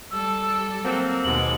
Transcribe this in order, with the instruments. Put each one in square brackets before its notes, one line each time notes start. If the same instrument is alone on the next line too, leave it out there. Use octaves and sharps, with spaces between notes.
[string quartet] G3 A4 [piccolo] E6
[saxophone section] F#3 A#3 C4
[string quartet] D#2 B2 G#3 [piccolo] F#7